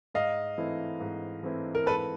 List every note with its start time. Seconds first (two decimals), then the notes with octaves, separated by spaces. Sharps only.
0.14 G#2 D#5 F5
0.58 E3 A3 C4 E4
1.00 G#2
1.43 E3 A3 C4 E4
1.75 A#4
1.86 G#2 A4 B4